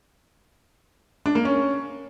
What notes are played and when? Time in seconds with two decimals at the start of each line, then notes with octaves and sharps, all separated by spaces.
1.26 D4
1.35 A#3
1.45 C#4